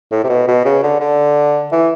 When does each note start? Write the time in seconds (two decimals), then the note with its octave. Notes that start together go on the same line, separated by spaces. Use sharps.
0.12 A2
0.24 C3
0.29 B2
0.48 B2
0.65 C#3
0.83 D3
1.00 D3
1.72 E3